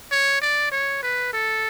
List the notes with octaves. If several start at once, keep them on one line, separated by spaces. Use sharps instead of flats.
C#5
D5
C#5
B4
A4